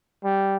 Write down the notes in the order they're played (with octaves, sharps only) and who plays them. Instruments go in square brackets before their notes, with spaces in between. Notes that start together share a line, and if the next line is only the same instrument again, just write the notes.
[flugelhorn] G3